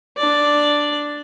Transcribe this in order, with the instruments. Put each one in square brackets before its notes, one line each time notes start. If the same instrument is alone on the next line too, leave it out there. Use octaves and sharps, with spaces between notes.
[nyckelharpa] D4 D5